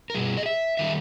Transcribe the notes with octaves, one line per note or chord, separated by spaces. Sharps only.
A#4
B2 G3 G#4
D#5
E5
D#3 G3 E5